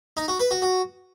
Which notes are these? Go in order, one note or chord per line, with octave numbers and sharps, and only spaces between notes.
D#4
F#4
B4
F#4
F#4